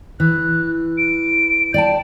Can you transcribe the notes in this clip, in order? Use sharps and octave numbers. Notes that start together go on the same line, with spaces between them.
E3 F#6
D7
D5 G5 A5